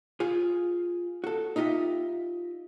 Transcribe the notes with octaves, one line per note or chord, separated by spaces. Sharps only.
F4 G#4
F#4 A4
D#4 F4 G4 D#5 E5